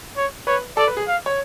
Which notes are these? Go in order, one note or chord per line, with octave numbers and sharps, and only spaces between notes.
C#5
B4 C#5
A4 D5
B4
G#4
F5
C#5